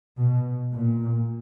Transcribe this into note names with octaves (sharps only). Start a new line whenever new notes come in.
B2
A#2